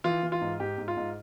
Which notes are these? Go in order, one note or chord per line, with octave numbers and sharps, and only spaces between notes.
E3 F4
E3
F4
G#2
G#2 G4
G#2
F4
G#2